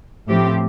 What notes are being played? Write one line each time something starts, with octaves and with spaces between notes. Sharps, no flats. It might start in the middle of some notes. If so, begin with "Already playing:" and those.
A2 F3 C4 G4